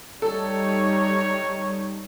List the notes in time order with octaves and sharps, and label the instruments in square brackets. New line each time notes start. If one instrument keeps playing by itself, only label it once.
[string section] G3 D#4 [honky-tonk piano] A4 [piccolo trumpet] C#5